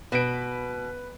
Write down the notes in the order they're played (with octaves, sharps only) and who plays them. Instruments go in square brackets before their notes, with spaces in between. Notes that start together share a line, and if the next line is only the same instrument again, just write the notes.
[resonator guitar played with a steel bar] B2 [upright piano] B4 D7